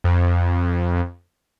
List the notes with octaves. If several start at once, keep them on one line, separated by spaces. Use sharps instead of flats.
F2